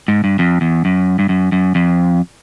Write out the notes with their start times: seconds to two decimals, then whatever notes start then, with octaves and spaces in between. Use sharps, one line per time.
0.08 G#2
0.24 G2
0.39 F2
0.61 E2
0.85 F#2
1.19 G2
1.29 F#2
1.52 F#2
1.75 F2